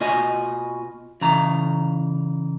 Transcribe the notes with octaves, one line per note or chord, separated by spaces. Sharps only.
B2 F4 D#5 G#5
C#3 E3 A#5